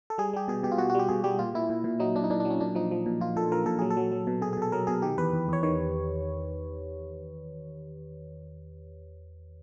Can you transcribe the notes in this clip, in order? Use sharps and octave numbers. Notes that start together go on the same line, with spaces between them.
A4
G3 G#4
G3 G4
B2 G#4
B2 G4
F4
B2 F#4
F#4
G3 G4
B2 G#4
G3 G4
A#2 F4
A#2 E4
A#2
A#2
F#3 D#4
A#2 D4
D#4
A#2 D4
D4
F#3
C#4
A#2 D4
F3 D#4
F3
A#2
A#2 F4
A#2 A4
F3 A#4
A#2 A4
F#3 G#4
A4
F#3
F#3
B2
B2 G#4
G#4
B2 A4
F#3 A#4
B2 G#4
D#3 G4
E2 B4
E2
E2 C#5
D#3 C#5